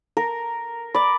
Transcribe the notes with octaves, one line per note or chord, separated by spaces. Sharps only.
A#4
D5 B5 D6